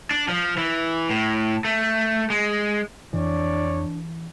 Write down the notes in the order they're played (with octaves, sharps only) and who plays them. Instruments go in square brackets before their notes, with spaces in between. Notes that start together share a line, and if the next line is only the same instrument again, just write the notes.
[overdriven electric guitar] D4
F3
E3
A2
A3
G#3
[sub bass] F2 [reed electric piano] E3 [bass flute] D4 [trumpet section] C#5 D5